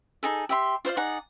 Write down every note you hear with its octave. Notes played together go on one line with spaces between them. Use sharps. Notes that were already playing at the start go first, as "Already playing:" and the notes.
D#4 G#4 A4
G4 E5 C6
F4 C5 D5 F5
D#4 G#4 D5 F#5